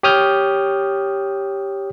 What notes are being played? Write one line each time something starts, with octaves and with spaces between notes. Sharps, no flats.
G4 C#5 D#6 F6 G6